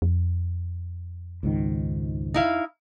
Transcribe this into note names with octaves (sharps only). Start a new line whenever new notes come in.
F2
C#2 G#2 D#3
D#4 E4 F5